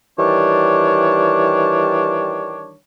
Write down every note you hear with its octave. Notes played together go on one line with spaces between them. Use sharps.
D#3 E3 G3 D4 C#5